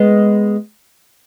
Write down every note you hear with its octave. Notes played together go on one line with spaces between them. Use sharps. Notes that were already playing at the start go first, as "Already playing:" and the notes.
Already playing: G#3 B3